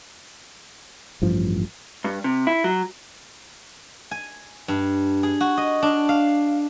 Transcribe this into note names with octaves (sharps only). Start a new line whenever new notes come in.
A1 G2 F3
G2
C3
E4
F#3
G#5
G2
G#4
F#4
D#5
D4
F5